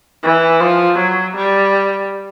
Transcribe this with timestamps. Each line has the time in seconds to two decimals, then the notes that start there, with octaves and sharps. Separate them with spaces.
0.23 E3
0.60 F3
0.98 F#3
1.36 G3